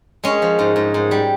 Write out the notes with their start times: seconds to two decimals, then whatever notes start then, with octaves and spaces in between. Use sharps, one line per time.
0.24 G#3 C#4
0.42 F3
0.59 G#2
0.76 G#2
0.94 G#2
1.11 G3